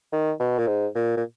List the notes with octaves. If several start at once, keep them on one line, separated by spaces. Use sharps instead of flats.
D#3
B2
A#2
G#2
A#2
A#2